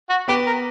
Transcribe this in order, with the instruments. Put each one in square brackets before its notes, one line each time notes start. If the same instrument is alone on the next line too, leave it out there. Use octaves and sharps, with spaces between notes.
[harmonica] F#4
[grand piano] B3 B4 [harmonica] G4
[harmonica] A#4